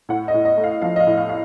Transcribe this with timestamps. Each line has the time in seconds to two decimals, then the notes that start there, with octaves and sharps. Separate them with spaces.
0.09 A2 F#5
0.28 D#5
0.34 A2
0.45 D#5
0.57 A3
0.64 F5
0.82 F3 F5
0.96 D#5
1.00 F5
1.07 A2
1.17 F5
1.29 F5